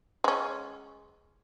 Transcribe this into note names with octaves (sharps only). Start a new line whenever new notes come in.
G#3 C#4